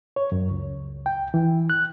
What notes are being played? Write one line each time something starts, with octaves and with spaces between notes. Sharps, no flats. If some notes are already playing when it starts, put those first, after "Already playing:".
C#5
F#2
C#2
G5
E3
F#6